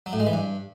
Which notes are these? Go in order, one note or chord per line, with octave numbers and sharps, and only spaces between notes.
F#3
A2
G#3
E3
G2